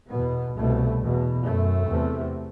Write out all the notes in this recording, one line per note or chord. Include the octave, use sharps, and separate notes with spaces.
E2 B2 B3
C2 B2 A3
E2 B2
F#2 A3
E2 C3